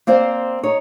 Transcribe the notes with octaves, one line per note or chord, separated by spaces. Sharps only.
A#3 C4 C5 D5
D#4 C#5